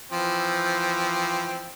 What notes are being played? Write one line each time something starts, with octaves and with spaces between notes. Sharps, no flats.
E3 F3 C4